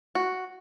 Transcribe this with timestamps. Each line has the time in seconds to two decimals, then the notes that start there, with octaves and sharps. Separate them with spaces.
0.15 F#4